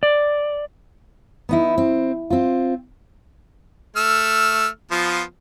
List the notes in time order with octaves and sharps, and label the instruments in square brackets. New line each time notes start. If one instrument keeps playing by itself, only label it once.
[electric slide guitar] D5
[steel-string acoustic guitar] B3 D#4 E4
C4
C4 F4
[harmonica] A3 E6 F6
F3 B3 F4